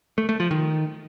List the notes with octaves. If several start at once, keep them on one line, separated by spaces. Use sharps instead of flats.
A3
A3
F3
D#3